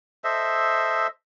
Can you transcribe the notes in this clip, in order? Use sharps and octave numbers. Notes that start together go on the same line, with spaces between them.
A4 C5 D#5 E5